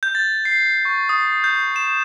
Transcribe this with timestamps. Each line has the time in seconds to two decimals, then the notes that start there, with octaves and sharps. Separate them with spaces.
0.03 G6
0.15 A6
0.45 C7
0.85 C#6
1.09 D#6
1.44 G6
1.76 E7